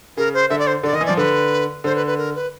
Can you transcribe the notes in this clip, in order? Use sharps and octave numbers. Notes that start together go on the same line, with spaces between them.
C#3 A#4
C5
D3 E5
D5
C5
D3 D5
D#3 D#5
E3
D5
F3
D3 B4
D3 C5
B4
B4
A#4
B4